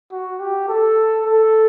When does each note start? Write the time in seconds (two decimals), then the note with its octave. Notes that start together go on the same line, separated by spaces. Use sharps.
0.12 F#4
0.40 G4
0.69 A4
1.26 A4